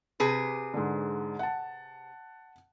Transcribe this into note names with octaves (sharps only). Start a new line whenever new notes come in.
C3 G#4 B4
G#2 D3
F#5 A5